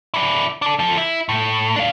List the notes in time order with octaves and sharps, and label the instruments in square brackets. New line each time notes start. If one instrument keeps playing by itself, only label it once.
[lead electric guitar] D4 E4
D4 A4
F3 A4
E4
A2
D4 F5